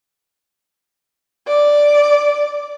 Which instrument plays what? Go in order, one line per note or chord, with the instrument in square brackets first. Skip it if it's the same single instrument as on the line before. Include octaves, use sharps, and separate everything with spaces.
[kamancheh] D5